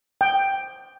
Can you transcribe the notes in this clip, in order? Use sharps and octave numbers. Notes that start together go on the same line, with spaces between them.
G5